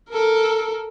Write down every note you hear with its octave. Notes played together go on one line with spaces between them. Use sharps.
A4 A#4